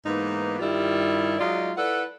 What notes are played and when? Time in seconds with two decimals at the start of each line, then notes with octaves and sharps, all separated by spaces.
0.06 G#2 E3 A#3 B3 D#4
0.60 G2 D#3 G3 E4 F4
1.39 F#3 G#3 D#4 F4 D5
1.77 E4 A4 B4 D5 F#5